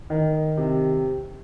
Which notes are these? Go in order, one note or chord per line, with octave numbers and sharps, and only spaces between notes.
D#3
C3